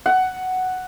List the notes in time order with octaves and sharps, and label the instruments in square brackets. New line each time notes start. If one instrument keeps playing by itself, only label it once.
[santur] F#5